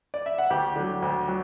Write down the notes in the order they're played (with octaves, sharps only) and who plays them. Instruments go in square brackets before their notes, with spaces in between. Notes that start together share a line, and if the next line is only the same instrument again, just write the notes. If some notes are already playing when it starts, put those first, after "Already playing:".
[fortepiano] D5
E5
F#5
D2 G4 G5
D3 F#3
D2
F#3